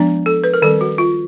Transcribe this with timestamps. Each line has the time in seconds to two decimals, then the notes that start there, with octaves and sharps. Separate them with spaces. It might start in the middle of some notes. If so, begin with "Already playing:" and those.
Already playing: F3 G#3 B3 D4
0.26 A4
0.44 B4
0.54 A#4
0.62 D#3 G3 C4 A4
0.81 F#4
0.98 F4